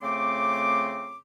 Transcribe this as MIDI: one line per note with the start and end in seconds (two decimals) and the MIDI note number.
0.02 1.18 41
0.02 1.18 49
0.02 1.18 57
0.02 1.18 60
0.02 1.18 84
0.02 1.18 86